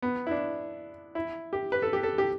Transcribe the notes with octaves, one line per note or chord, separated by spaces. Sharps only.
B3
E4
D4
E4
G4
B4
A4
G4
A4
G4